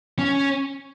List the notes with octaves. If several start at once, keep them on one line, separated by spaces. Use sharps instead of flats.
C#4